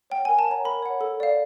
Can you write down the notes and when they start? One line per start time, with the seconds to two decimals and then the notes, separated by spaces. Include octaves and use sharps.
0.10 C#5 F#5 G5
0.25 A#4 G#5
0.39 A5
0.47 C#5 F#5 A#5
0.65 A#4 B5
0.82 C#5 F#5
1.01 A4
1.20 D5 F5